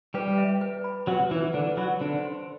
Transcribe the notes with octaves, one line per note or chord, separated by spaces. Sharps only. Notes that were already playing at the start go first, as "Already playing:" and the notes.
G3 G4 B4
E5
B4
B5
F#3 F#4 B4
E3 E4 B4
D3 D4 B4
F#3 F#4 B5
D3 D4 C5
C6